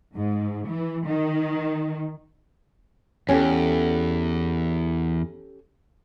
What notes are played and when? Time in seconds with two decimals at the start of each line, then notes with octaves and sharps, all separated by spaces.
0.15 G#2
0.67 E3
1.06 D#3
3.29 E2 C#4 G4 A4